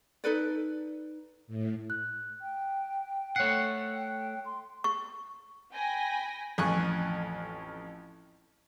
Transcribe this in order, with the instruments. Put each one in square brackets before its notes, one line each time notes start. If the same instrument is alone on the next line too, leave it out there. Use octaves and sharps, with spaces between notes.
[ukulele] D#4 A4 B4 D5
[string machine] A2
[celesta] F#6
[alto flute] G5
[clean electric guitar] A3 F#5 [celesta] C#5 C7
[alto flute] G5
C6
[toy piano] C#6
[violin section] G5 G#5 B5 A#6
[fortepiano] A1 F2 G#5 C#6 F#6